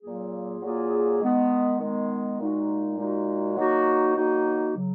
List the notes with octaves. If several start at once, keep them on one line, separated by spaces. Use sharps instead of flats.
A#2 F#3 A#3 F4 G#4
A#2 F#3 A#3 F4 G#4
D#3 G#3 B3
D#3 G#3 B3
A#2 G#3 D#4 F#4
A#2 G#3 D#4 F#4
D#3 F#3 A#3 D#4 F#4
D#3 F#3 A#3 D#4 F#4
C#3 F#3